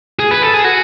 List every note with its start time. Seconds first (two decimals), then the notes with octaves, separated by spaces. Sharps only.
0.19 G#4
0.31 B4
0.43 A4
0.54 G#4
0.65 F#4